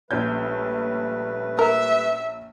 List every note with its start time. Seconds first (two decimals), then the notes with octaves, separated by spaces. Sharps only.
0.11 A#1 G3 A3 C#4 B4 G6
1.59 A#4 E5